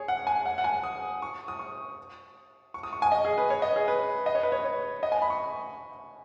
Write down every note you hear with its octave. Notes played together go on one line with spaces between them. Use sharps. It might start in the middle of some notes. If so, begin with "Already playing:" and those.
Already playing: G#4 C#5
F#5
G#5
F#5
F#5
G#5
D#6
C#6
D#6
C#6
C#6
D#6
C#6
G#5
D#5
G#4
B4
C#5
D#5
G#4
B4
D#5
C#5
B4
C#5
C#5
D#5
G#5
B5
C#6